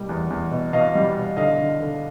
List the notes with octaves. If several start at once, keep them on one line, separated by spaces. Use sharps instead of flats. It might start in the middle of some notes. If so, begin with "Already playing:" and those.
Already playing: B2 G3 A#3
E2
E2
B2
B2 D#5 F5
G3
B2
D3 D#5 F5
D3
D3